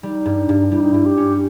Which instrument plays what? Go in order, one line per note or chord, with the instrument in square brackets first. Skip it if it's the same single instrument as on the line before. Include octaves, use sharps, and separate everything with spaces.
[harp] G3 [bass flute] D#4
[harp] G2
G2
[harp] G3 [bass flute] E4
[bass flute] D#4
[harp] G2 [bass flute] E4
[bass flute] G4
[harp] C#4